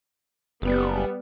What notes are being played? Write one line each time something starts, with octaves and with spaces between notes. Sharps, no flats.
F#1 G3 B3